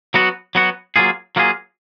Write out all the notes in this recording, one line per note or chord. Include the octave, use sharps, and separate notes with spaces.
F#3 B3 F#4
F#3 B3 F#4
F#3 A#3 F4 G#4
F#3 A#3 F4 G#4